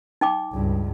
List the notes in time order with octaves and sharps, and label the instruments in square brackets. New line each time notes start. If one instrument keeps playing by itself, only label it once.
[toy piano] D#4 G5 D6
[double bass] C#2 G2